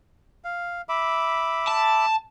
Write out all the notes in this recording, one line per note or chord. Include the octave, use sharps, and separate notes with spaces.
F5
E5 B5 D6
A5